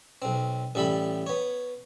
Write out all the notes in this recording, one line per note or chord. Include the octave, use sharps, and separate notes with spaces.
B1 C4
A1 G3 A4 E5 B5
B3 C#5